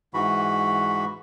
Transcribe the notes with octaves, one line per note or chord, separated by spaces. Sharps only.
G#2 E3 F#4 B5